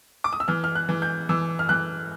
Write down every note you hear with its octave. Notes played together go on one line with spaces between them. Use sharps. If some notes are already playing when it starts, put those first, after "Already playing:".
D6
D#6
E6
E3 F6
F6
F#6
E3
G6
E3 E6
F6
E3 F#6